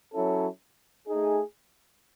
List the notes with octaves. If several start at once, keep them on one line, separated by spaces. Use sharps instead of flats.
F#3 C#4 E4 A4
A3 D#4 G#4